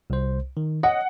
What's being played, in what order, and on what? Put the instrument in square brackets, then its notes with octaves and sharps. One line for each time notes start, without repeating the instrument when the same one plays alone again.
[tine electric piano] C2 C5
D#3
[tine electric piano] C#5 D#5 [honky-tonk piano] F#5